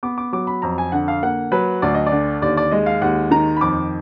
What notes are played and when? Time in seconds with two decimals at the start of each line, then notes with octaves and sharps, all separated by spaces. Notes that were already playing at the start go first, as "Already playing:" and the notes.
0.03 B3 D6
0.18 D6
0.33 F#3 D6
0.47 B5
0.62 F2 A#5
0.78 G#5
0.92 D3 F#5
1.08 F5
1.23 A#3 F#5
1.52 F#3 B4
1.82 D2 D5
1.95 D#5
2.07 D5
2.12 D3
2.42 D#2 D5
2.57 D5
2.71 G#3 D#5
2.86 F5
3.01 D#2 F#5
3.31 D#3 A#5
3.57 B5
3.61 F2 D6